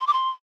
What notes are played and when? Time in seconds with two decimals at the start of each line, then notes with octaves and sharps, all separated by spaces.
0.01 C6
0.07 D6
0.13 C6